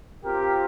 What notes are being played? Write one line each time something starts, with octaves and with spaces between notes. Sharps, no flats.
C4 F4 G4 A#4